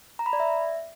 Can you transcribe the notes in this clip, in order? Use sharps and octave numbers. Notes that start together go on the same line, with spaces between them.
A#5
B5
D5
E5